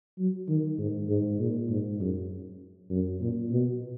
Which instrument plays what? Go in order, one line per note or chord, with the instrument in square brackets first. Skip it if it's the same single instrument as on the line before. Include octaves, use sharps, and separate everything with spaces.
[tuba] F#3
D#3
G#2
G#2
A#2
G#2
F#2
F#2
A#2
B2